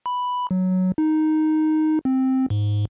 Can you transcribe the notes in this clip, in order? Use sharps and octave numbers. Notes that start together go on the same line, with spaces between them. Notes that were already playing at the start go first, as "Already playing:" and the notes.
B5
F#3
F#3
D#4
C4
G#2